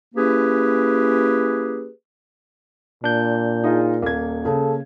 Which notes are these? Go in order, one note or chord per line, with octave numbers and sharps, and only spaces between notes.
A#3 C#4 E4 G4 G#4 B4
A#2 D4 G6
D#4 F4 G#4
D#1 A#3 G#6
C#3 A4